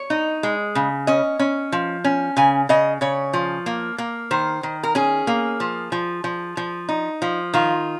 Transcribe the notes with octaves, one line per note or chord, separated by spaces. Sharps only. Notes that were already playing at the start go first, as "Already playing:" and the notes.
Already playing: C#5
D#4
G#3
C#3
C#4 D#5
C#4
F3
C#4
C#3 G#5
C#3 D#5
C#3 C#5
F3
A#3
A#3
D#3 C5
D#3
A#4
C#4 G#4
A#3
F3
F3
F3
F3
D#4
F3
D#3 F4